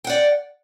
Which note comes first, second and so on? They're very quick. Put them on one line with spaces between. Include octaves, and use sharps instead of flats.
G5 F#5 D5